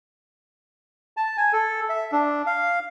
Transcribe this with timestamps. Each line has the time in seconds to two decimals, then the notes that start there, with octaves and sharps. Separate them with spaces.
1.17 A5
1.37 G#5
1.53 A4
1.89 E5
2.12 D4
2.47 F5